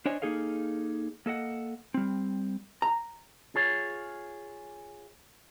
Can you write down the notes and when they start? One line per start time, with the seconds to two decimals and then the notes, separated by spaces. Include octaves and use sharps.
0.05 D4 C5 C#5 D#5 G#5
0.22 A#3 D#4 G#4 A4 F5
1.26 A#3 A4 D#5 F#5
1.94 G3 C4
2.82 A#5
3.55 F4 G#4 C#5